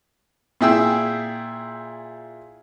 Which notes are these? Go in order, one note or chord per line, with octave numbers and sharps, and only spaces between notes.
A#2 E4 G#4 G5 E6